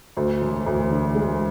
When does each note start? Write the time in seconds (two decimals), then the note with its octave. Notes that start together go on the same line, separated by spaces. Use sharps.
0.17 D2
0.41 E1
0.66 D2
0.90 D3
1.15 G#3